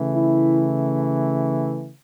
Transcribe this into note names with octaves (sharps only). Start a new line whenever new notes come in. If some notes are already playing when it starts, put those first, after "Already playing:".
Already playing: C#3 E3 A3
E4